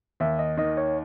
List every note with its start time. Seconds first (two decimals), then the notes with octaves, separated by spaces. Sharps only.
0.20 D#2 E5
0.39 D#5
0.57 D#3 D#5
0.77 C#5